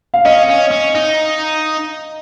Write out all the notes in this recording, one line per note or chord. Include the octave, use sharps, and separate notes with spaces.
F5
C#4 D#5
C#4
C#4
D#4